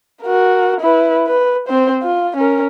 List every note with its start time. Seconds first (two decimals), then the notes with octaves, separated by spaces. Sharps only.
0.23 F#4 A#4
0.81 E4 B4
1.27 B4
1.68 C4 C5
2.03 F4
2.36 C#4 A#4